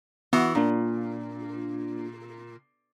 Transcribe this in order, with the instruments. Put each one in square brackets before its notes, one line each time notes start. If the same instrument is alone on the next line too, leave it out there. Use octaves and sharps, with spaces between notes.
[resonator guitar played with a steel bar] E3 F#4 F#5 [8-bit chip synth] B3
[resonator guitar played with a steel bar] A#2 [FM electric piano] A#3 D4 F4